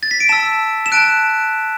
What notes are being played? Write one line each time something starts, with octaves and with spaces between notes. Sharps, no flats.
A6
B6
D7
A5 E6 E7
E7
A5 F#6 D7